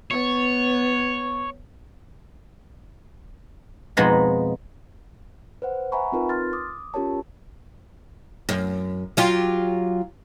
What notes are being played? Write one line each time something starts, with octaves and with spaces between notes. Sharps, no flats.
B3 C#5
F2 B2 G#3 B3 D#4 B5
B4 C5 F#5
E5 F#5 G#5 A#5 B5 C#6
C4 D#4 F4 A#4 B4
C6 F6 A6
D6 D#6
C#4 F4 G4 A#4 C#5 A5
F#2
F#3 F4 G4